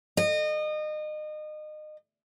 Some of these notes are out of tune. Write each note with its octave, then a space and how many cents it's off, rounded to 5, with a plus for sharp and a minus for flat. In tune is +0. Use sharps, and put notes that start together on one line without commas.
D#5 -30